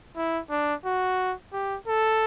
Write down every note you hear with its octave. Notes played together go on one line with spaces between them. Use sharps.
E4
D4
F#4
G4
A4